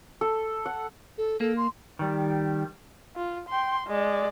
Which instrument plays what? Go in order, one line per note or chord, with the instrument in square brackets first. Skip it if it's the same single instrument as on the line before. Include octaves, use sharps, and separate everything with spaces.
[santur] A4
F#5
[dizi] A4
[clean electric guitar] A#3 [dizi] A4
[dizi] C6
[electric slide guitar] D#3 G3
[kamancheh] F4
G5 C6
G#3 D5